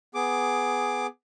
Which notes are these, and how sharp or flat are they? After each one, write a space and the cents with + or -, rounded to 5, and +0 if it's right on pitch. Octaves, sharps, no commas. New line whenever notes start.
B3 +10 G#4 +5 D6 +5